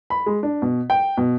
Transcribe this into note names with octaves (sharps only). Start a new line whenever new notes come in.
B5
G#3
D4
B2
G5
B2